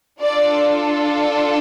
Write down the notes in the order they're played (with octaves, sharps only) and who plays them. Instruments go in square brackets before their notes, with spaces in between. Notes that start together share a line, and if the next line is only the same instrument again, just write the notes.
[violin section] D4 F4 A4 D5